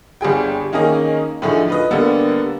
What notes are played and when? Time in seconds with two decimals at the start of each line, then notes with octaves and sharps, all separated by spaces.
0.21 G1 G3 G#4 G5
0.73 D#3 A#3 C#4 D#4 G#4 D#5
1.42 A2 D3 F3 A3 D#4 G#4
1.68 F4 B4 D#5
1.91 D3 G3 A#3 B3 A4